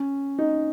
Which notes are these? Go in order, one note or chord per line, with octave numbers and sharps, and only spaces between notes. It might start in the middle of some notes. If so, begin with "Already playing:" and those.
Already playing: C#4
D#4